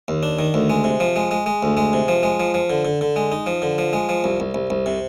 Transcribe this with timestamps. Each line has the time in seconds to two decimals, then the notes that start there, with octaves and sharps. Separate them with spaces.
0.08 D#2
0.23 D4
0.39 D#3
0.54 D2
0.70 G#3
0.84 C3
1.00 F3
1.16 G#3
1.31 G#3
1.46 G#3
1.63 D2
1.77 G#3
1.93 C3
2.08 F3
2.23 G#3
2.40 F3
2.54 F3
2.70 D3
2.85 D3
3.01 D3
3.16 G#3
3.32 D#4
3.46 F3
3.62 D3
3.78 F3
3.93 G#3
4.09 F3
4.24 C2
4.40 C2
4.54 C2
4.70 C2
4.86 C3